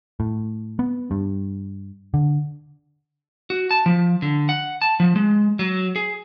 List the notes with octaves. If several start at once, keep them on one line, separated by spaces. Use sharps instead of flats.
A2
B3
G2
D3
F#4
A5
F3
D3
F#5
A5
F3
G#3
F#3
G#4